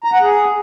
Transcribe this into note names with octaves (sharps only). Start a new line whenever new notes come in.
A#5
F#5
G#4